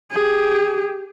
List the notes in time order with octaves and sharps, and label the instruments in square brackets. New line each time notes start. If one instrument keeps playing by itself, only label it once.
[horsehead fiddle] G4 G#4